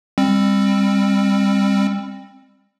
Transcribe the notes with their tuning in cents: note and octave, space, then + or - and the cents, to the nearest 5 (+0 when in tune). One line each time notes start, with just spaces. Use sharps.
G3 +30 C4 +20